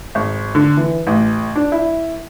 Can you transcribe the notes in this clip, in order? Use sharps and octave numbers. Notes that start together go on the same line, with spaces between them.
G#1
D3
E3
A1
D4
E4